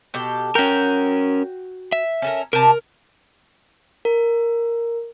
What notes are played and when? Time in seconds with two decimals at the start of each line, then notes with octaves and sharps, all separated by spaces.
0.14 B2 G4 A4
0.55 C#4 F#4 A#4 G5
1.92 E5
2.22 C#4 A4 A#4
2.53 C3 A#4 A5
4.05 A#4